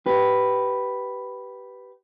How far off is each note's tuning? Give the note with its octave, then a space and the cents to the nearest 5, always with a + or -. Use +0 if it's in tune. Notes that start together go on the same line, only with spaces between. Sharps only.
G4 -20 B4 +0